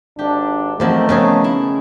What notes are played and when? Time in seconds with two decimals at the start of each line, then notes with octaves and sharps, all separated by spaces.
0.19 G#1 D4 G4
0.80 E2 D#3 F3 F#3 A3 C4 A4 C5
1.09 F2 C#3 B3 C#4 G#4 A#4
1.44 E4